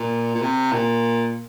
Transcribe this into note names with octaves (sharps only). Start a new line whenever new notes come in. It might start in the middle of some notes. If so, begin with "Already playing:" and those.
Already playing: A#2
A#2
C3
A#2